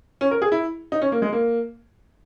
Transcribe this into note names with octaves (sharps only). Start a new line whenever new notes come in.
C#4
A#4
G#4
E4
D#4
C#4
A#3
G#3
A#3